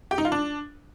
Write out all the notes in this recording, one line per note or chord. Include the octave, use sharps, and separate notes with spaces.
G4
D#4
F4
D4